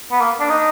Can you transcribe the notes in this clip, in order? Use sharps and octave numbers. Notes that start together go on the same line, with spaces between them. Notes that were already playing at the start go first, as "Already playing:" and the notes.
B3
A#3
D4
D#4